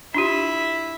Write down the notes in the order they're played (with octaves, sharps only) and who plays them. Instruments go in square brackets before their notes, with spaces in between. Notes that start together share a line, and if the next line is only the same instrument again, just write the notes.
[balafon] D4 F4 G4 [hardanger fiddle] E4 E5